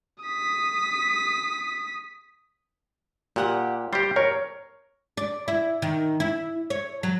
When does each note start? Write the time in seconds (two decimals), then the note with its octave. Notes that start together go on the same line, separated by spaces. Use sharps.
0.23 D#6 B6
3.36 A#2 G4 F#5 D#6
3.93 G3 G4 C5
4.16 A#4 C#5
5.17 D5
5.48 E4
5.82 D#3
6.20 E4
6.70 C#5
7.03 F#3